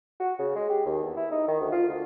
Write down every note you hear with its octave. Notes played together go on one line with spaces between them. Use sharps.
F#4
C#3
G#3
G4
D#2
E2
E4
D#4
D#3
D2
F4
D2